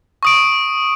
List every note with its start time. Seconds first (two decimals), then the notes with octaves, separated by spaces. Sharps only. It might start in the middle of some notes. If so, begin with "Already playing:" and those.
0.23 C#6 D#6 D7